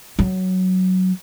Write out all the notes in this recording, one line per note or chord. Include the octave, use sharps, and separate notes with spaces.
F#3